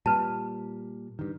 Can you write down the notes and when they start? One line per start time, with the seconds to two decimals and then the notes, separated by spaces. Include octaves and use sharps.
0.06 A#2 G3 B4 A5
1.19 G2 D#3